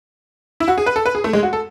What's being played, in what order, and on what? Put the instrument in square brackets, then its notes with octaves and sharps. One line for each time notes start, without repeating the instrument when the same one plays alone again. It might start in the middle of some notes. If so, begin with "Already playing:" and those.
[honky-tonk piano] E4
F#4
G#4
B4
A4
B4
G#4
A3
G#3
F#4
A4